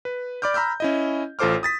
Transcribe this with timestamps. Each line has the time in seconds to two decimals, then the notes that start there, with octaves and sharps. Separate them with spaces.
0.05 B4
0.42 D5 B5 D6 F6 G6
0.54 A#5 B5 E6 F6 G6
0.80 C#4 E4 D#5
1.39 A1 F4 A4 C5 D6 F6
1.63 D#6 A6 B6